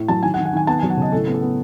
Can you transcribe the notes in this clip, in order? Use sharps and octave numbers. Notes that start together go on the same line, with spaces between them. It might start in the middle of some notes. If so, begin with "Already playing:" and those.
Already playing: A2
F#3 A5
D#3 G#5
F#5
D#3
F#5
D#3 G#5
B3 A5
F#3 G#5
F#5
C#3 D#5
A2 A4
B3
A4
B3